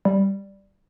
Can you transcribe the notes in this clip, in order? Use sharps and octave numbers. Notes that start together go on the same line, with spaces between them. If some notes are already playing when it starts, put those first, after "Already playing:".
G3